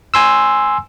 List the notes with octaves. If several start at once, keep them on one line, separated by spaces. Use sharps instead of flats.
G#5 C6 E6